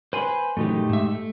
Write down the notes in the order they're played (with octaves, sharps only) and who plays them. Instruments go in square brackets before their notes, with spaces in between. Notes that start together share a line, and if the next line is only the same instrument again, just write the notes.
[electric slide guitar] B4 [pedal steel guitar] C5 G#5 C6
[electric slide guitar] F#2 A#2 E3 [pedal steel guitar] A3 D#4 G4
[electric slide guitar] G#2 E5
A3